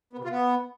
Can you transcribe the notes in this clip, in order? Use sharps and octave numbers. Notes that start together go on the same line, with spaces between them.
B3
C3
F4
B3